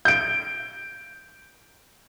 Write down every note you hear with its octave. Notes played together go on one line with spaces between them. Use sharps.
G6 D7